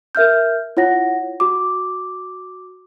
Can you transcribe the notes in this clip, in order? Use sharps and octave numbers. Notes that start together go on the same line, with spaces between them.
A#4 E5 F6 G6
E4 F4 C#5 F#5 A#6
F#4 D6